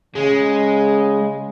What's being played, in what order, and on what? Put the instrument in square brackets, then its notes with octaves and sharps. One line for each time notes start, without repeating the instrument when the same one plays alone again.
[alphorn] C#3 [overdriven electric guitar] G#3